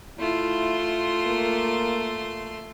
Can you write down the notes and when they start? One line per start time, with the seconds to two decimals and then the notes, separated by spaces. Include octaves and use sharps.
0.19 A3 E4 F4 C6
1.26 A#3